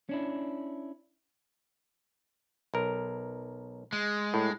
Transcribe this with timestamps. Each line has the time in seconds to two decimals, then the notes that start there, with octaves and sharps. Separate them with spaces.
0.09 C#4 D4 E4
2.74 B1 A#4
3.93 G#3
4.34 A2